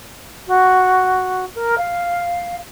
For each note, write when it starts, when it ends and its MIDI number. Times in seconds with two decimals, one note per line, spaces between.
0.47 1.45 66
1.55 1.75 70
1.77 2.55 77